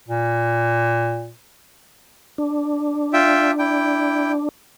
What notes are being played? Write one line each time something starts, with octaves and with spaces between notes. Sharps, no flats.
A#2
D4
F4 E5 G5
E4 G5